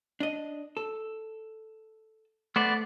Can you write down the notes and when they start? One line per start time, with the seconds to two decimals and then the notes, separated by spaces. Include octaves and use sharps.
0.20 D4 D#5
0.77 A4
2.56 A3 B3 C5 D5